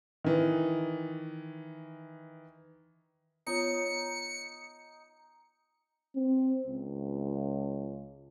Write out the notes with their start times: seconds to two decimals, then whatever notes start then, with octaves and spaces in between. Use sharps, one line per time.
0.24 D#3 E3
3.47 B3 D#4 F4 C#5 C#7
6.16 C4
6.67 C#2